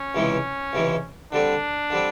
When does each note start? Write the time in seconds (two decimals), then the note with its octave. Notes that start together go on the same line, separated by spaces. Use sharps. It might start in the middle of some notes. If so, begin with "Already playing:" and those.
Already playing: C#4
0.15 C#2 C3 E3 G#3
0.73 C#2 C3 E3 G#3
1.32 D3 G3 C4 D4
1.90 D3 G3 C4